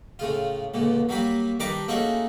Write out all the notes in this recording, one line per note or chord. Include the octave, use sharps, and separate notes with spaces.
A2 C#3 F4
C#2 A#2 D3
F#3 G3 A#3 B5
D#3 G3 D4 B4 A#5 D6
A3 A#3 C#4 D#4 F#4 G#4